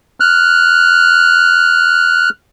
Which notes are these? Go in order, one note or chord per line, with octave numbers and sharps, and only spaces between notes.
F6 F#6